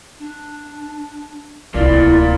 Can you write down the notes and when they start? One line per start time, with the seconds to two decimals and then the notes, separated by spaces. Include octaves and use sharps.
0.19 D4
1.74 D1 C2 A#3 E4 F4 D5